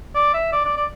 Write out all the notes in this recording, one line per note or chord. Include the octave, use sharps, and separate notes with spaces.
D5
E5
D5
D5
D5